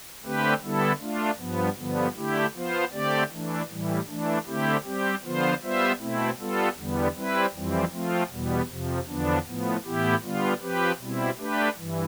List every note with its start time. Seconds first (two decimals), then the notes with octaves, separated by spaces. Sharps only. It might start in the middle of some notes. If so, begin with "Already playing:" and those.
0.23 D3 A3 C4 G4 B4
0.62 D3 G3 B3 E4 A4
1.00 A3 D4 F4
1.39 G2 F3 B3
1.77 G2 D3 F3 B3
2.15 D3 A3 E4 G4
2.54 F3 B3 F4 C5
2.92 D3 A3 C4 G4 D5
3.31 E3 A3 D4
3.69 A2 E3 G3
4.07 E3 A3 D4
4.46 D3 A3 C4 E4 G4
4.84 G3 C4 G4
5.23 D3 F3 B3 F4 C5
5.61 G3 B3 F4 C5 E5
5.99 B2 A3 C4 E4
6.38 G3 B3 F4 A4
6.77 E2 D3 G3 B3
7.15 G3 C4 E4 B4
7.54 F2 E3 G3 C4
7.93 F3 A3 C4 F4
8.31 E2 B2 G3 B3
8.70 F2 C3 F3
9.07 E2 D3 F3 B3 D4
9.46 A2 F3 B3
9.85 A2 E3 B3 E4 G4
10.23 D3 G3 B3 F4
10.61 F3 C4 G4 B4
10.99 B2 G3 C4 E4
11.38 A3 D4 G4 B4
11.77 G2 E3